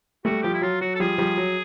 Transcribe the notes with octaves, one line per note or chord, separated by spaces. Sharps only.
G3 A3 F#4
F3 G3 G4
E4
F#3 F4
F#3 F#4
A4
F3 G3 G#4
F3 G3
F#3